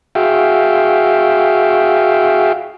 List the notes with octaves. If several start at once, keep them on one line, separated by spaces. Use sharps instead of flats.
F#4 G#4 E5 F5 G5